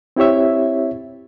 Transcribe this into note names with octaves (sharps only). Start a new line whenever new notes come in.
C4 E4 G4 C#5 E5